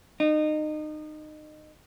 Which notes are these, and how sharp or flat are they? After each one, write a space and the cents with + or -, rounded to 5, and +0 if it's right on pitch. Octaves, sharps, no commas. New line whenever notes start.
D#4 -25